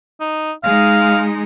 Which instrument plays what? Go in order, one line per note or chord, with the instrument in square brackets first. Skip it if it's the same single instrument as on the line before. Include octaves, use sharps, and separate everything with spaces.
[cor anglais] D#4
[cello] G#3 D#4 [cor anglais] F5